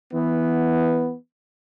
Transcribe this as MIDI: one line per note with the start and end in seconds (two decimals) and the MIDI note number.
0.13 1.15 52
0.13 1.15 59